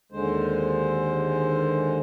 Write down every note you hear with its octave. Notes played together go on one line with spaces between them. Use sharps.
D#2 D3 G#3 C5